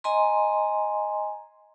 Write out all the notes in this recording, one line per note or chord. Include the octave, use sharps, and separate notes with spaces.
D#5 G#5 A#5 C6